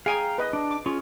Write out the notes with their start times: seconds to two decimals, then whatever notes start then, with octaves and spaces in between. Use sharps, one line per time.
0.06 G#4 F5 G5 G#5 A#5
0.38 B4 D#5
0.53 D4
0.71 D6
0.86 C#4 F4 G#4